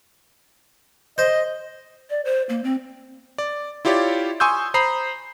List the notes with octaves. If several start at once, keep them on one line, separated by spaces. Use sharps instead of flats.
C5 D#5
D5
C5
A#3
C4
D5
E4 F4 G4 C#5 D5 D6
G#5 C6 C#6 D#6 E6 G6
C5 A#5 B5 D#6 C7